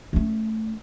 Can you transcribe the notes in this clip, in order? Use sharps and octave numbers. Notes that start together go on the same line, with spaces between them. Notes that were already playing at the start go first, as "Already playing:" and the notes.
A3 C#4